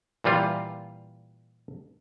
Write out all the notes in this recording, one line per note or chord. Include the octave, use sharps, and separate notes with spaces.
A#2 E3 G3 F4